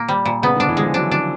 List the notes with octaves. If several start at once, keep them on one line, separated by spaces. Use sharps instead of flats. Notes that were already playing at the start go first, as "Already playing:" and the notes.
Already playing: A#2 A#3
G3
A#2
C#3 B3
D3
D4
E3
G#3
F3
F#3 D4
D4